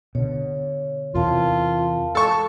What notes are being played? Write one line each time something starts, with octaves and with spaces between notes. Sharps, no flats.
B2 D3 C#5
E2 C3 E3 F4 A#4 F5 A5
A4 A5 C#6